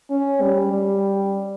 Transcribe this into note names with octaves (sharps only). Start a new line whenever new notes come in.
C#4
G3
G3